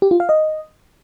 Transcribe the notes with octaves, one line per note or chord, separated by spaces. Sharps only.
G4
F4
F5
D#5